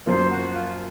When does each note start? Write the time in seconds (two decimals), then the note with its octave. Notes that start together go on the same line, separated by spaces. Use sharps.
0.06 F#2 F3 A#3 C5
0.29 F#4
0.53 F4